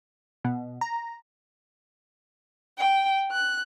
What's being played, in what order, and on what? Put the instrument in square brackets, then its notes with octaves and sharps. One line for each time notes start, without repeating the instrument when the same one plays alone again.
[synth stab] B2
A#5
[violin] G5
F#6